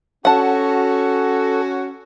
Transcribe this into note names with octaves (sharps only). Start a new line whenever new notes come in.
C#4 F#4 A4 F#5 A5